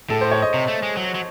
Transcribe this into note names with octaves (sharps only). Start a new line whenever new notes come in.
A2 A4
C5
C#5
D#5
C3
A3
G#3
F#3
F#3